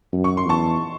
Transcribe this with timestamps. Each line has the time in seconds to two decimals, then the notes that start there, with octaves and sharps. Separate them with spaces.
0.13 F#2
0.24 C#6
0.37 C6
0.46 E2 A5 C#6